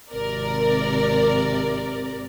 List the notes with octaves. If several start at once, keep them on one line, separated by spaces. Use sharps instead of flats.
G#1 C3 A#4 D5